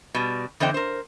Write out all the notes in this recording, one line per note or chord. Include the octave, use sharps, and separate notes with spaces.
B2 G3
E2 D3 C5 D#5 G5
A#4 C5